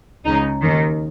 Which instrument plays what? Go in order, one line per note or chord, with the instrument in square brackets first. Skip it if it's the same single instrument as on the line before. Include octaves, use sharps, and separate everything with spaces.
[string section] C#2 C#3 D#4
D#2 D#3